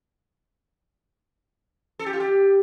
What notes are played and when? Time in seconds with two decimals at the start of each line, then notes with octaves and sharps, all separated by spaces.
1.99 A4
2.06 G4
2.13 F4
2.20 G4